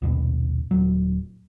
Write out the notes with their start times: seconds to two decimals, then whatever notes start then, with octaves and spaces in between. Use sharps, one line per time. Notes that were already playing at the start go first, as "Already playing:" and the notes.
0.02 A#1 D#2 B2
0.71 D#1 F#3